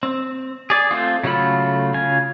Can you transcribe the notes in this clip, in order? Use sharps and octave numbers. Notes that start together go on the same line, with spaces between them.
C4
G#4 D5
A3 C4 F4
C#3 F#3 A3 F4 B5
C#3 F4 G#5